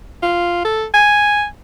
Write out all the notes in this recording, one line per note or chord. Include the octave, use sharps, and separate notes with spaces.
F4
A4
G#5